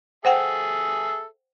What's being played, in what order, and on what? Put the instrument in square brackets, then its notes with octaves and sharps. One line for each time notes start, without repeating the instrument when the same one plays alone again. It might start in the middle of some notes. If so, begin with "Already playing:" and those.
[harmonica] G#4 A4 E5 [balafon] C5 F#5 G5